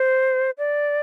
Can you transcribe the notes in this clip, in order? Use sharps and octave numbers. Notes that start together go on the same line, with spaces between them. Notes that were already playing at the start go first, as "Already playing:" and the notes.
Already playing: C5
D5